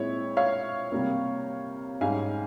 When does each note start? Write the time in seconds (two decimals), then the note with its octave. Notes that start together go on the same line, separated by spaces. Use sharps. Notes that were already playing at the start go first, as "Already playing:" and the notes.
Already playing: A#2 G#3 C4 E4 C#5
0.37 C#5 F5
0.92 C3 G3 A#3
2.01 G#2 G3 C#4 F5 G#5